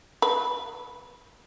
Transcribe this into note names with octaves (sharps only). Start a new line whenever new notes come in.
B4